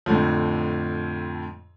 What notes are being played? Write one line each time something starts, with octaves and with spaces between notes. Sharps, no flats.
F2 A2 D3 F3